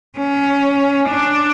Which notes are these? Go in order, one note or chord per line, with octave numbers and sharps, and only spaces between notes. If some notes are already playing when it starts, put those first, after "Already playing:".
C#4
D4